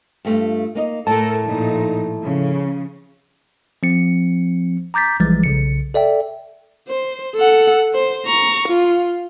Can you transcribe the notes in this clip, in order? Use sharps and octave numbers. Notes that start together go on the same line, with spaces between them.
G2 A3 F4
A#3 D#4 D#5
A2 A3 A4 A#4 A5
A#2 F3 D#4
C#3 F3
F3 C4 C#7
A#5 D6 G6 A6 B6
A#1 E3 F3 G3 G#3 A6
B1 C#3 C#7
A4 D5 E5 G5
C5
A4 F#5
C5
A#5 C#6
F4